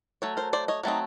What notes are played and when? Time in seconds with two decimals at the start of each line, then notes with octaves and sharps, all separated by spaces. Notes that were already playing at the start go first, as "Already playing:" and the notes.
0.22 F#3 A3 C#5
0.37 A#4 C5
0.53 C5 D5
0.68 C#5 D#5
0.83 F#3 A3 C4 D#4